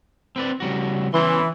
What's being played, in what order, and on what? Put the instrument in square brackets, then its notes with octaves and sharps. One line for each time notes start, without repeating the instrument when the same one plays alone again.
[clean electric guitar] C4 B4 D5
C#3 G3 F#4
[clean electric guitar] E2 C#4 C6 [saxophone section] E3